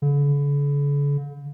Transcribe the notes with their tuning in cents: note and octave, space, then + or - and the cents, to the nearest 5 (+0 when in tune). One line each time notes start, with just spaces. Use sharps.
D3 -45